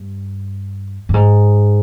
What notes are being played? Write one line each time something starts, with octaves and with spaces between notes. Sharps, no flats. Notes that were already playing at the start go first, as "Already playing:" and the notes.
Already playing: G2
G2
G#2